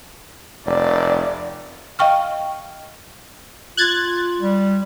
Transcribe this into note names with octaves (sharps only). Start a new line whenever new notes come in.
F1 D5
D#5 F5 G5 C#6 F6
F4 F#6 G#6 A6
G3